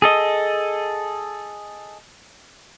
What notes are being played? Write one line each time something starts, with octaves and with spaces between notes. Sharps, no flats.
G#4 A4 D#5